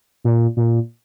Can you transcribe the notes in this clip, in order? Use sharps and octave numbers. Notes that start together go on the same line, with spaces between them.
A#2
A#2